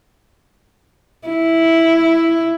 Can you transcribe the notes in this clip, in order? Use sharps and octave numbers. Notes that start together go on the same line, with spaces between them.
E4